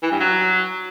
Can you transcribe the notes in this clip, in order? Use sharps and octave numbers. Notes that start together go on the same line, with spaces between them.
E3
G2
F#3